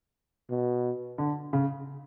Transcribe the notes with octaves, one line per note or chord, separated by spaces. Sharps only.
B2
D3
C#3